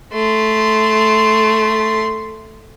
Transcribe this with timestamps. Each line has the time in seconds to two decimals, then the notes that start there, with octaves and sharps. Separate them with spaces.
0.12 A3 C6